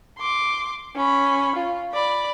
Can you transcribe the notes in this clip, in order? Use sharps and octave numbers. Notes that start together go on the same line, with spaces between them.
C6 D6
C#4 B5
F4
D5 B5